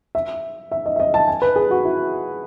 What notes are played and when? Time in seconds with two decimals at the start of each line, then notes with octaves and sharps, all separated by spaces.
0.15 E5
0.71 E5
0.86 D#5
0.96 E5
1.00 D#5
1.14 A5
1.27 G#5
1.42 B4
1.56 G#4
1.71 F#4
1.85 E4